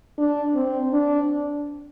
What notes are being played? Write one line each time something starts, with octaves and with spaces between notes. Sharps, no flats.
D4
C4
D4